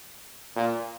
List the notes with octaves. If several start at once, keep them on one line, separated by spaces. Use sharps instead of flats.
A#2